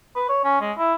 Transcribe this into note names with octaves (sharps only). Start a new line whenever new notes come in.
B4
C#5
C#4
G#3
E4